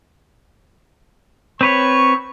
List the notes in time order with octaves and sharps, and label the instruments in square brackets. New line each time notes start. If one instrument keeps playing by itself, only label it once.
[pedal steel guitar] C4 B4 C#5 [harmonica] C#6